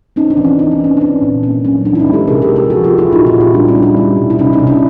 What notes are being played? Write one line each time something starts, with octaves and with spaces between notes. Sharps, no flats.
C4 C#4 D#4
D4
E3
C#4
E3 D#4
D4
C4 C#4
C#4 D4
A#2
A#3 C#4
F#3 C#4
E3 D4
E4
C#4 D#4
G#3
G4 A4
C3 G#4 A#4
G4 A4
G#3
G4 A4
F3 F#4 G#4
F4 G4
C4
E4 F#4
A#2 D#4 F4
E4 F#4
A#2
F4 G4
G3 D4
C#4 D#4
G3
D4 E4
G3
B2
E4
C3 C#4 D#4
C#4 D#4
C3
D4 E4